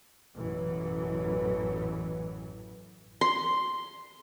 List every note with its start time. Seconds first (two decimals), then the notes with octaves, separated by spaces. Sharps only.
0.35 A1 F#2 B2 E3 F#3
3.21 C6